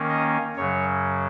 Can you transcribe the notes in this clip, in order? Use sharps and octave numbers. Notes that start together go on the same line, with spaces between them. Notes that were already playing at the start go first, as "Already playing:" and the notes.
Already playing: D#3 A#3 C#4
D#5
F#2 C#3 F#3 C#5